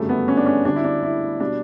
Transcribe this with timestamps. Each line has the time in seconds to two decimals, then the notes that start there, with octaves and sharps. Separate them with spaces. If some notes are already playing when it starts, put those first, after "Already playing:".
Already playing: G1 F#2 C#3 G3 A3
0.09 B3
0.28 C#4
0.37 D4
0.46 C#4
0.65 D2 D3 G3 D4
0.76 E4
0.84 D4
1.03 E4
1.40 B2 G3 D4